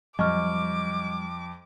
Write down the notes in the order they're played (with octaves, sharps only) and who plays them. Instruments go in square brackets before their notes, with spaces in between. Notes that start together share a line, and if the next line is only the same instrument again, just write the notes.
[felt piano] F2 [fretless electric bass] F#3 G3 [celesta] D#5 C#6 F6 [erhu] D6